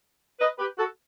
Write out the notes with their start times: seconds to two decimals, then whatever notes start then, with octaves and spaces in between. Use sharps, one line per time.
0.40 B4 D#5
0.59 G4 B4
0.78 F#4 A4